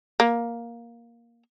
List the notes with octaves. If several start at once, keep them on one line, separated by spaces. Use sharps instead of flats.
A#3